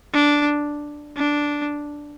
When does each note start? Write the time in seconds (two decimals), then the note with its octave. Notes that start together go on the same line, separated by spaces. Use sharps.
0.13 D4
1.17 D4